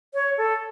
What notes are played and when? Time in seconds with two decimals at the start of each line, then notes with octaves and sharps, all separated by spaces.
0.14 C#5
0.38 A4